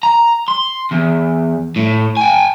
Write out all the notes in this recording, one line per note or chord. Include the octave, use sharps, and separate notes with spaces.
A#5
C6
E2
A2
G5 G#5